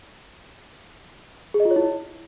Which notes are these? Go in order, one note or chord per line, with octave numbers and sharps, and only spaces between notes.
G#4
D#5
F4
C#5
E4